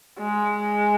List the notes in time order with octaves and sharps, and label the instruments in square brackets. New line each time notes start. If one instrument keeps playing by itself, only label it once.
[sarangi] G#3